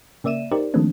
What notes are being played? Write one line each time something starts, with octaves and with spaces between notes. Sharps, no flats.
C#3 A#3 D5 E5 D#7 E7
D#4 G4 A#4 C5 D5
D#3 F3 A3 A#3 C4 D4